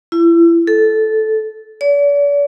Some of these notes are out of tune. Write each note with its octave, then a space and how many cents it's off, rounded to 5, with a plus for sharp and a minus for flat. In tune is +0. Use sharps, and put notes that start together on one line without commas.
E4 +35
A4 -10
D5 -45